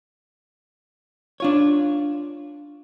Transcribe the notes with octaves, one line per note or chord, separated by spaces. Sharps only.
D4 F4 C#5